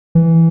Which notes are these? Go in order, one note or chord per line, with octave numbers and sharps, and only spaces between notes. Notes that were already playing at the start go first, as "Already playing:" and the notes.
E3